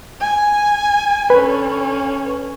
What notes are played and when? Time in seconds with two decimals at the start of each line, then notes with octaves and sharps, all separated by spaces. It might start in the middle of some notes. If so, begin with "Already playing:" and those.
0.20 G#5
1.30 D3 C#4 B4